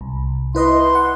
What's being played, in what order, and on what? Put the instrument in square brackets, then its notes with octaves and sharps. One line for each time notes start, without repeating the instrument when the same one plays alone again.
[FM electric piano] C2
[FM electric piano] E4 B4 D#5 [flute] C6
[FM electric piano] F#5